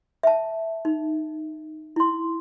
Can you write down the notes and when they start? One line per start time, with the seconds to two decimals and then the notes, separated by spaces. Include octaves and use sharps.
0.23 E5 A5
0.85 D#4
1.96 E4 C6